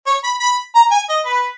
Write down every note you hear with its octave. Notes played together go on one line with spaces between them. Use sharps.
C#5
B5
B5
A#5
G#5
D#5
B4